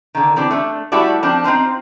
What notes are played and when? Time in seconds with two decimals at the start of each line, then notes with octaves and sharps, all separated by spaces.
0.15 D3 D#3
0.36 E3 C4 D4 G4
0.51 A3 D4
0.92 G3 A3 E4 F#4 A4 D5
1.23 F3 C4 D4
1.44 C4 D#4 F4 C5